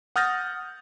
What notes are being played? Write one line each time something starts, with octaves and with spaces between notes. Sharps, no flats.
F#5 D#6 F6 G6 A6 A#6